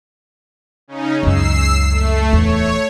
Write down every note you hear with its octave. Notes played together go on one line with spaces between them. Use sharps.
C#3 C#4 D#4
C#2 F#2 E6 C7
A3
D1 E2 C#5